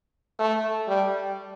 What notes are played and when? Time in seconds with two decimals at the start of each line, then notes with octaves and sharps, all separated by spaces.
0.39 A3
0.88 G3